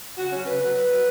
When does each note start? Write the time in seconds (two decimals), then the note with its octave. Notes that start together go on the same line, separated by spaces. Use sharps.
0.18 C#3 F#4
0.32 F#3 C#4
0.47 C#3 B4
0.61 F#3 B4
0.75 F#3
0.90 F#3